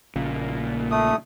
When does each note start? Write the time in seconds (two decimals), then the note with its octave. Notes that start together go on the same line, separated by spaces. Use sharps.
0.16 A#1 A#2 C#3
0.91 A3 D#6